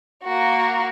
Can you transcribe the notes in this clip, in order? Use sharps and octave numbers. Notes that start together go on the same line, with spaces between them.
A#3 F#4